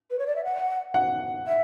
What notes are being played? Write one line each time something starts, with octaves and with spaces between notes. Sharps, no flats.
B4
C#5
D5
E5
F#5
F#5
E5